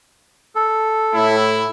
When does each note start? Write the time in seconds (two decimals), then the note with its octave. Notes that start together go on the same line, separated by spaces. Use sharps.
0.55 A4
1.15 A2 E4